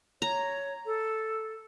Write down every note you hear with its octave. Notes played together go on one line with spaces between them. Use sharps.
C#5 A#5
A4